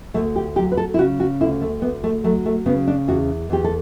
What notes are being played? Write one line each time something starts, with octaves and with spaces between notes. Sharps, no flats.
D2 A3
G4
F#3 G4
B4
A4
E4
C#3 F#4
F#4
D2 E4
A3
D2 B3
A3
F#3 A3
A3
C#3 B3
D4
E2 F#4
E2 G4
A4